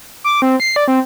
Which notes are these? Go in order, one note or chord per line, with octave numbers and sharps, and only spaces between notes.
D6
C4
C7
D5
C4